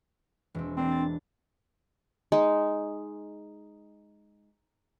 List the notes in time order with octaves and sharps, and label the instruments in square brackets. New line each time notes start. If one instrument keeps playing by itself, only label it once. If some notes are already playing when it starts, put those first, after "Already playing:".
[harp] E1 C4
[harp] A#3 D4 [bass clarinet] C4
[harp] A6
[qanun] G#3 D#4